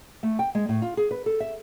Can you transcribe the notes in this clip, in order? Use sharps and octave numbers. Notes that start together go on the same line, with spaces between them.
A3
G5
G#3
A2
F4
G#4
B4
A4
E5